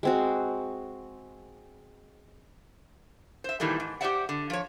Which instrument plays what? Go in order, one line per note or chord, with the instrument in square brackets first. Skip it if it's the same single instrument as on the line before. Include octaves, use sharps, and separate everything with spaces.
[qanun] G#3 C4 F#4
[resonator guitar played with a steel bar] C5 E5
A#2 D#3 E3 G3 A3
G#2
G4 G#4 C5 D5 E5 F#5
D3
F3 C#5